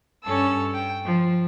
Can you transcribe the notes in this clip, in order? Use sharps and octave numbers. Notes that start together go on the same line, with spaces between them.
G2 C#4 A4 A5 E6
G5
F3